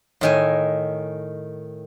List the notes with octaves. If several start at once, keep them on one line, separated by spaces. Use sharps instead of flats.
A2 D#3 G#5